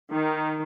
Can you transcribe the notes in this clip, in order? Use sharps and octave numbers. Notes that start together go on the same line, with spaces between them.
D#3